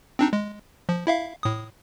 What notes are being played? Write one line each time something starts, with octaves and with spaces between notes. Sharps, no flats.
C4 D4 D#4
G#3
F3
E4 E5 F5
A2 D#6